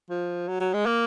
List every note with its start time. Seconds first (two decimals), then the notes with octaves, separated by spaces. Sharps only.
0.10 F3
0.48 F#3
0.60 F#3
0.74 G#3
0.86 A#3